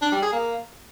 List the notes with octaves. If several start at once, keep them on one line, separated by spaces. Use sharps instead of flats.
D4
G3
G#4
A#3